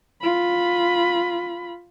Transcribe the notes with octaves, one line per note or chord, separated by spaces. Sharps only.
F4 B5